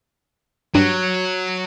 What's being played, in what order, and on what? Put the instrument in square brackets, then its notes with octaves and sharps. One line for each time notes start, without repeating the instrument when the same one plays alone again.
[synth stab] G2 [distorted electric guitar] F#3